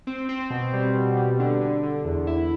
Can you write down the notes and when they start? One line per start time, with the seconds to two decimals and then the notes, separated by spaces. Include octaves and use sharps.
0.07 C4
0.29 C4
0.50 B2
0.73 G3
0.94 B2
1.17 G3
1.40 D3
1.61 D3
1.83 D3
2.05 E2
2.27 E4